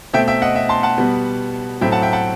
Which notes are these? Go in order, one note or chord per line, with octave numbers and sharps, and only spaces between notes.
B2 A3 C4 E5 G5
E5 G5
D#5 F#5
E5
A5 C6
F#5 A5
B2 G3 B3
A2 F#3 A3 C4 E5 G5
F#5 A5
E5 G5
F#5 A5